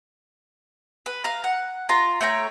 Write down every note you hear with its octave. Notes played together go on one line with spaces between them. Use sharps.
B4
F5 A#5
F#5
F4 A#5
A3 C#5 G5 A#5